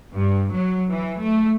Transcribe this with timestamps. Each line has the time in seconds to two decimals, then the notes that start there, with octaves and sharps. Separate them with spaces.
0.15 G2
0.55 F#3
0.90 E3
1.21 A3